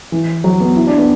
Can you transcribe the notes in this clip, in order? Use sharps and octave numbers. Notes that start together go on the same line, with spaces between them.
E3
F#3
B3
E4
D4
B3